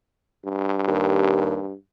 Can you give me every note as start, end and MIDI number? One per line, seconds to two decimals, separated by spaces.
0.45 1.74 43
0.87 1.59 39